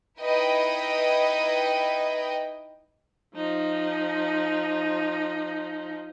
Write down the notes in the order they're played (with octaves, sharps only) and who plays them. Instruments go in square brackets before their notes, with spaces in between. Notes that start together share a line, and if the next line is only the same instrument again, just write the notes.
[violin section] D#4 E4 B4 D#5 G5
[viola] F3 D#4